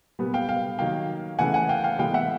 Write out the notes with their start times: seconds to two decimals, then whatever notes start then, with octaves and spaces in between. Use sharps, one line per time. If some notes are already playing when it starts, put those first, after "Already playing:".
0.19 A#2 G3 B3
0.34 F5 G5
0.49 F5 G5
0.79 D#3 F#3 A#3 F5 G5
1.39 C#3 E3 A3 F#5 G#5
1.54 F#5 G#5
1.69 F5 G5
1.84 F5 G5
1.99 A2 E3 G#3 B3 F5 G5
2.14 E5 F#5